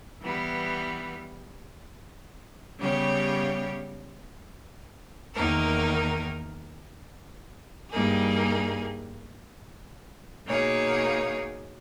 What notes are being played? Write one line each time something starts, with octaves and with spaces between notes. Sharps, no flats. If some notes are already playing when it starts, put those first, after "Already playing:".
E3 G3 B3
C#3 G3 B3 G4 C#5
E2 D#3 A#3 D#4 A#4
G2 G3 A#3 D#4 G#4
B2 A#3 D#4 G#4 C#5